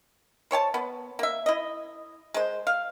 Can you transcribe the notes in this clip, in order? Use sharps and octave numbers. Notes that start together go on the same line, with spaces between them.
C5 C#5 G#5 A5
B3
A#3 E5
E4 D#5
G#3 C5
F5